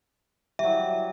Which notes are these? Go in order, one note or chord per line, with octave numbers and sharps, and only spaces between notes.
F#3 G3 E5